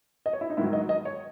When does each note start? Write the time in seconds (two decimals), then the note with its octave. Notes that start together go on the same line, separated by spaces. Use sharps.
0.26 D#5
0.33 C#5
0.41 E4
0.50 D#4
0.57 G#2 D#3 F#3 E4
0.73 D#5
0.89 D#5
1.05 C#5